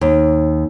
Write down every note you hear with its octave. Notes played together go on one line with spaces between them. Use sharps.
D#2